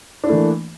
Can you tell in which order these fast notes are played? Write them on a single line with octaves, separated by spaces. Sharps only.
D4 E4 A3 E3 A#3